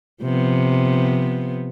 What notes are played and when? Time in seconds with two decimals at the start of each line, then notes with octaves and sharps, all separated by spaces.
0.22 C3 F3 B3